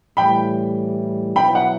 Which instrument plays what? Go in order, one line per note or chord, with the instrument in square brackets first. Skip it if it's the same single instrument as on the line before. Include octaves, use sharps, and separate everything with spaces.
[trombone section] A2 E3 G3 [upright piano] G5 B5
[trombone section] B2 F#3 B3 E4 [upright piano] G5 B5
[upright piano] F#5